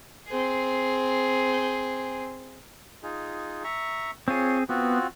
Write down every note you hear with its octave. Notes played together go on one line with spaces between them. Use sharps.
C4 G#4
D#4 F4 G#4
E5 A#5 C#6
C4 F4 G#4 C#5 C6
B3 C4 F4 F#4